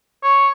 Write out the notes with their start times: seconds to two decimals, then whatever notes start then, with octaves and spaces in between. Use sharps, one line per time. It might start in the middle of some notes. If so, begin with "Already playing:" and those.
0.23 C#5